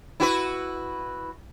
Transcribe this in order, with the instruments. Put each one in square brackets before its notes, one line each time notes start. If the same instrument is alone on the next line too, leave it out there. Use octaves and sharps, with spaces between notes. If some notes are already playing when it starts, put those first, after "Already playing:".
[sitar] E4 F#4 B4